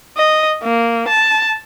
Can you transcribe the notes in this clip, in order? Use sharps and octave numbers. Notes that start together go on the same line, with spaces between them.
D#5
A#3
A5